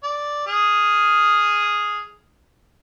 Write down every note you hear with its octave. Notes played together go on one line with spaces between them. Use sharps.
D5
G#4 D#6 F6